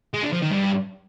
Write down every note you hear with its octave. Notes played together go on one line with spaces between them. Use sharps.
G#3
D3
F3
D#3
G2